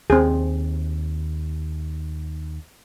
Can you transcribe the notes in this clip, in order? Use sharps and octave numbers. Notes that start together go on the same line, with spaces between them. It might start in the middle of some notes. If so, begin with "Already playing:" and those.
D#2 C4 G#4